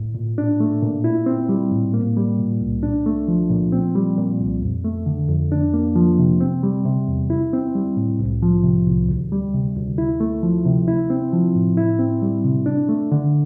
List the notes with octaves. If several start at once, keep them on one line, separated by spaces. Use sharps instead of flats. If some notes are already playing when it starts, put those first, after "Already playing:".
Already playing: A2
A#2
D4
A3
A#2
E4
C4
G3
A2
A#3
G3
A#2
C2
D4
A3
F3
A#2
C4
G3
A#2
C2
F2
A3
D3
F2
D4
A#3
F3
C3
C4
G3
C3
E2
E4
C4
G3
A2
C2
F3
C3
C2
D2
G3
C3
D2
E4
A3
F3
C3
E4
C4
F3
A2
E4
C4
G3
C3
D4
A3
D3